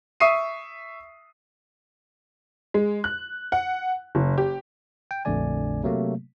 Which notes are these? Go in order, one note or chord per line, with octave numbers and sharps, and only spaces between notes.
E5 C#6 D#6 C7 D#7
G#3
F#6
F#5
F#1
G4
G5
A#1 F2 D3 A3 D5 G#5
C3 F#3 A3 A#3